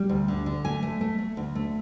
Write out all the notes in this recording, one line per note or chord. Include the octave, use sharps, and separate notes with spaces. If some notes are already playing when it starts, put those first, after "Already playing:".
Already playing: G3
D2
D3
D3
A3 G#5
A3
A3
A3
D2
A3